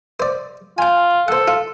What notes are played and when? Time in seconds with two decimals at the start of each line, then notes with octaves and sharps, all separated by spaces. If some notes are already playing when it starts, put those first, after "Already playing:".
0.20 C5 D5
0.78 F4 G5 G#5
1.28 A4 C5 F#5
1.48 F4